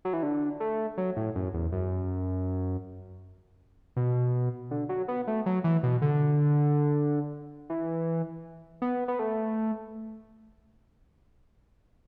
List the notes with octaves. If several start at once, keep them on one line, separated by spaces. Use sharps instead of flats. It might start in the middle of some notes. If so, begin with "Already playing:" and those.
F#3
E3
D3
A3
F#3
A2
F#2
E2
F#2
B2
D3
F#3
B3
A3
F#3
E3
B2
D3
E3
B3
B3
A3